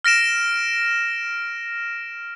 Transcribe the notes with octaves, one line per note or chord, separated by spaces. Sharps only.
F6 A#6 D7 E7